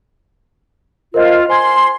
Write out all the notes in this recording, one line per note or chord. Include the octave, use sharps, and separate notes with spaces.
F4 A#4 C5 D#5
C5 G#5 C6 G#6